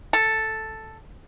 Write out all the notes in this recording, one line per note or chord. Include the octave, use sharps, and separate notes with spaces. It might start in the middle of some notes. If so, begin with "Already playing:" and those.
A4